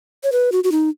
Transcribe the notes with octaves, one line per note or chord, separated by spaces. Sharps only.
C#5
B4
F#4
F#4
D#4